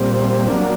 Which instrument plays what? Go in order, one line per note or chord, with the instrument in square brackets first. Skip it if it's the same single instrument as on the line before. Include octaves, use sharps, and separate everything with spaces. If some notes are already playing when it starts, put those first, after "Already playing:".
Already playing: [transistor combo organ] A#2 G3 C4
F#3 A#3 D4